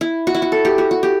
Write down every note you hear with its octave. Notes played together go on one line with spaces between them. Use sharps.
E4
F#4
E4
F#4
A4
G4
F#4
F#4
G4